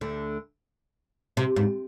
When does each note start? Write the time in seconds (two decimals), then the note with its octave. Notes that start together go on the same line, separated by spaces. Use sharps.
0.01 D2 D3
1.37 C3
1.56 G#2